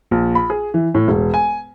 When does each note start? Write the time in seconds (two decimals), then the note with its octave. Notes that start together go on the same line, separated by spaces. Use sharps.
0.11 A#1
0.35 B5
0.50 G#4
0.74 E3
0.95 A2
1.08 E1
1.34 G#5